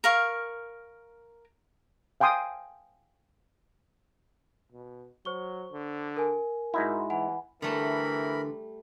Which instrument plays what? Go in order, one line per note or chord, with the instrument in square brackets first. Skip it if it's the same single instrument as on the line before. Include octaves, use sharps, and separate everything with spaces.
[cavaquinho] A#4 F5 C#6
[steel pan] F5 G5 G#5 C6 D#6
[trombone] B2
[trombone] F#3 [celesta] C5 C#6 G7
[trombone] D3
[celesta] A#4 G#5
[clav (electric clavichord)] G#2 D#4 E4 [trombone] F#4
[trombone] E3 [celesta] F#5 G#5 B5
[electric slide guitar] D3 [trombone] E3 [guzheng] G3 A3 A5 [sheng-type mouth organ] A#4 B5